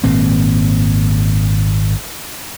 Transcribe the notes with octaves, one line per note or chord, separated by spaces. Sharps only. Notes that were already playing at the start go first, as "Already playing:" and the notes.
G#1 A#2 A#3 C4